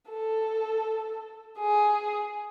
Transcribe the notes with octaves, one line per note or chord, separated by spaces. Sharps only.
A4
G#4